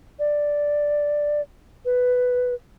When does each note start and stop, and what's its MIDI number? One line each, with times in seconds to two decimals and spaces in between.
0.19 1.41 74
1.85 2.54 71